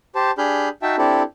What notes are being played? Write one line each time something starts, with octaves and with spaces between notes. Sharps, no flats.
G4 C5 A5
D4 G4 G#4 B5 F6 G6
D#4 F#4 E5 G5 A5
C4 D4 E4 G4 A4